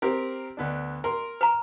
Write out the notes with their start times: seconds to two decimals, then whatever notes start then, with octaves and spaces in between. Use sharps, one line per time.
0.02 C4 G4 A#4
0.57 D2 B3 D4
1.04 A#4 C6
1.41 B4 A#5